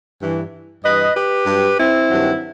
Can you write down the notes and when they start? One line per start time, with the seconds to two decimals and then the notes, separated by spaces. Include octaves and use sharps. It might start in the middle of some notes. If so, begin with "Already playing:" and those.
0.21 G2 E3
0.83 G2 E3 B4 D#5
1.15 G4 B4
1.47 G2 F#3
1.78 C4 E4
2.09 G2 D#3 F#3